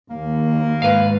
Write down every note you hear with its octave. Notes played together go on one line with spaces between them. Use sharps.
D#2 A#3
G#2 B4 F5